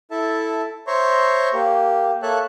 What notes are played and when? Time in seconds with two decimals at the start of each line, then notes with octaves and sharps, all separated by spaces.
0.11 E4 A4 E5 A5
0.87 C5 C#5 E5 A#5 C6 C#6
1.53 A#3 G4
2.22 A#3 A4 C#5 E5 A5 F#6